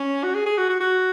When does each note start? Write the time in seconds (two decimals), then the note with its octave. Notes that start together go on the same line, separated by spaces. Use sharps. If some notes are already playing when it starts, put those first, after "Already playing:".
Already playing: C#4
0.24 F#4
0.34 G#4
0.46 G#4
0.58 F#4
0.70 F#4
0.81 F#4